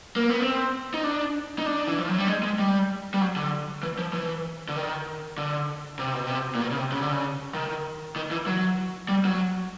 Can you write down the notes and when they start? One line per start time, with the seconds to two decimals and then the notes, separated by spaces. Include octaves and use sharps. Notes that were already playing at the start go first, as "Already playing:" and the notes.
0.16 A#3
0.29 B3
0.42 C4
0.94 D#4
1.04 D4
1.58 D#4
1.66 D4
1.88 E3
1.98 F3
2.08 F#3
2.18 G3
2.28 G#3
2.43 G#3
2.59 G3
3.14 G3
3.21 F#3
3.36 D3
3.83 E3
3.99 F3
4.13 E3
4.69 D3
4.76 D#3
5.38 D3
5.99 C3
6.13 B2
6.27 C3
6.55 A#2
6.61 B2
6.71 C#3
6.77 C3
6.92 C#3
7.02 D3
7.12 C#3
7.54 D#3
8.16 D#3
8.31 E3
8.46 F#3
9.09 G3
9.25 F#3